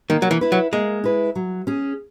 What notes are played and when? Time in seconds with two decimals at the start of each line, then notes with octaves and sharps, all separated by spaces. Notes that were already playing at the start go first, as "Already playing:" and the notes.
0.10 D#3 A#3
0.22 F#3
0.31 E3
0.41 E4 B4
0.52 F#3
0.73 G#3 A#3
1.04 E4 B4
1.35 F#3
1.67 C#4 G#4